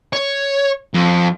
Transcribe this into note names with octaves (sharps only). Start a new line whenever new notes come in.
C#5
F2